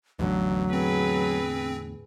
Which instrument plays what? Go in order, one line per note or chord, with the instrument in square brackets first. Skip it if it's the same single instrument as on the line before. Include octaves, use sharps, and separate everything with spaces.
[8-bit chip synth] A1 [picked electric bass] E2 A2 D3 [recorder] F#3
[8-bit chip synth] C4 [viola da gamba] G#4 B4